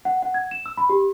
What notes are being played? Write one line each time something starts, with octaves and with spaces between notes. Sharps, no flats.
F#5
F#5
G#6
E7
E6
B5
G4